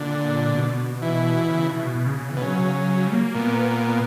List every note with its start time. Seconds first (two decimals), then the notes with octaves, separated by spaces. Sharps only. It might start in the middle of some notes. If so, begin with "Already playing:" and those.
Already playing: A#2 D3
0.55 B2
1.02 E3
1.48 C#3
1.72 B2
1.95 B2
2.06 C#3
2.18 C#3
2.29 E3
2.37 B2
2.42 C#3 F#3
2.88 F#3
3.07 G3
3.12 A#3
3.35 A#2 B3